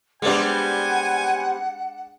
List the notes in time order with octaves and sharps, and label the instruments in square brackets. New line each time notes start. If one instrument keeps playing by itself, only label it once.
[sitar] G3 B3 C4 [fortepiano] G#3 D4 [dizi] F#5 [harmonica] G#5